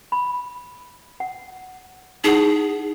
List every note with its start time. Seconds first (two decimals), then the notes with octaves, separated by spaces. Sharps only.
0.12 B5
1.20 F#5
2.24 D#4 E4 G#4 F#5